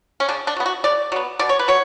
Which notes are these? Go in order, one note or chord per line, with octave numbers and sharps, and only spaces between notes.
C#4
C#3 D4
D4
F#3 B3
F#4
C#3 D5
F#3 B3
B2 D5
C#5
B4
F#3 C#5